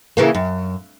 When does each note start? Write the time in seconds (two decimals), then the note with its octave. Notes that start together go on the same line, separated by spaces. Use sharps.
0.17 C#3 E3 A#3
0.35 F#2